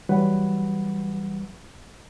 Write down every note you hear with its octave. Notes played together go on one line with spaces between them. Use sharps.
E3 F#3 G3 B4 F#5